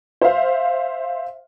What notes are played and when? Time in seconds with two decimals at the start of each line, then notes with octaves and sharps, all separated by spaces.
0.21 C5 E5 F5